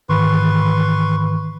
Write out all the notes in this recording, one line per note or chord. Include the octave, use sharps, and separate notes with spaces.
G#2 D#3 E3 B4 C6 C#6